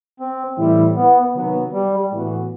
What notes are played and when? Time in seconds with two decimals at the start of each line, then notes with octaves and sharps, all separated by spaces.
0.20 C4
0.58 A2 E3 G3 C4 E4
0.96 B3
1.35 C3 D#3 F#3 B3
1.73 G3
2.11 A2 E3 B3 F#4